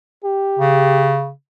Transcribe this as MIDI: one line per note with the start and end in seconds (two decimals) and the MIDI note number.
0.24 1.17 67
0.59 1.30 49